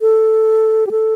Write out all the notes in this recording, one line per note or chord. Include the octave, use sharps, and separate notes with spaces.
A4
G4
A4